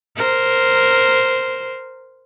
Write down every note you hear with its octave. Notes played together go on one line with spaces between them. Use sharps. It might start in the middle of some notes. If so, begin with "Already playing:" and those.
A#4 C5